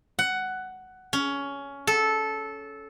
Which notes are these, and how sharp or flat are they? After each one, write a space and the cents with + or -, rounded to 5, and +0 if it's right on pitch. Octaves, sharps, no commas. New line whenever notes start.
F#5 +10
C#4 +15
A4 -15